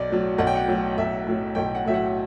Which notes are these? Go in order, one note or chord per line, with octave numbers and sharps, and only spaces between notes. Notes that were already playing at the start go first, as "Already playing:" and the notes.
Already playing: B1 D5
A2 F#3
B1 F#5
G5
F#5
A2 F#3
B1 E5
A2 F#3
B1 G5
F#5
A2 F#3 E5
F#5